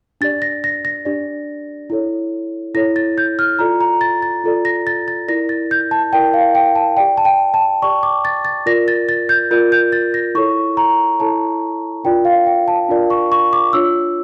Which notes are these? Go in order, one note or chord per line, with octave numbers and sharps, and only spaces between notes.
D4 G4 D5 A6
A#6
A#6
A#6
D4 G4 D5
E4 A4 C#5
E4 A4 C#5 A#6
A6
G6
F6
F4 A4 D5 A#5
A#5
A6
A6
F4 A4 D5
A#6
A6
A6
E4 A#4 D5 A#6
A6
G6
A5
E4 A#4 D5 G5
F5
G5
A5
G4 D5 G5
A5
G5
A5
G4 D5 C#6
D6
A6
A6
F4 A#4 D5 A#6
A6
A6
G6
F4 A#4 D5 G6
G6
A6
A#6
E4 A4 C#5 C#6
A#5
E4 A4 C#5 A5
D4 F4 A#4 D5 G5
F5
G5
A5
D4 F4 A#4 D5
C#6
C#6
D6
D4 F4 C#5 E6